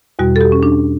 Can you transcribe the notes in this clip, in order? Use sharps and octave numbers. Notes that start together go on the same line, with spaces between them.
E2 B2 G3 F#4
A4
G4
C#4
D4